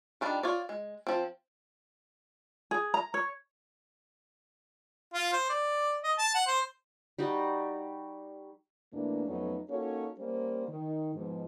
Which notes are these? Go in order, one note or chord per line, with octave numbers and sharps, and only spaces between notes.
D#3 G3 D4 F4
F4 C#5 D5
G#3
F3 C4
G#4
A#5
C#5
F4
C5
D5
D#5
A5
F#5
C5
G3 D#4 F#4 D5
E2 B2 E3 A3 A#3 D4
F2 F#3 A3 B3 C#4 D#4
A#3 C#4 D#4 F#4 A4 C#5
G3 A#3 C#4 C5
D#3
G#2 B2 F3